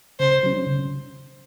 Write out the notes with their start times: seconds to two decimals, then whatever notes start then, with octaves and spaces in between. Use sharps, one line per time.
0.19 C#3 C5
0.43 F#3 C#4
0.67 C#3